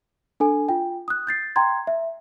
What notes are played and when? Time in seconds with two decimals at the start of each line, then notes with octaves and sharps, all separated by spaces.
0.40 D4 A4 G#5
0.69 F4 G5
1.08 D#6 F#6
1.27 G6 A6 C7
1.56 G5 A#5 C6 G#6
1.87 E5